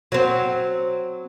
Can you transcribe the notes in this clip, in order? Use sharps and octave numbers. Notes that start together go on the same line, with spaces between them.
F#3 C4